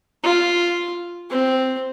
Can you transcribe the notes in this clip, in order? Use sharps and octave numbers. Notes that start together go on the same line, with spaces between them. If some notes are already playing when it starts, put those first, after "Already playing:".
F4
C4